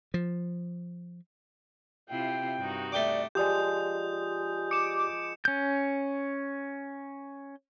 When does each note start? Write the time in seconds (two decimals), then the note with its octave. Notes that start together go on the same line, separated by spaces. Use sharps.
0.14 F3
2.10 C3 E4 F4 G5
2.58 G2 D#4 F#4
2.92 A3 D5 G5 D6
3.35 F3 G#3 G4 D5 D#6 G6
4.71 D6 C#7 E7
5.45 C#4 G6